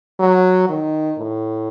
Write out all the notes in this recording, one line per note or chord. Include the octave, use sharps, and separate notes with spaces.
F#3
D#3
A2